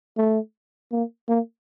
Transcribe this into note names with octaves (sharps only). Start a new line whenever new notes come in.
A3
A#3
A#3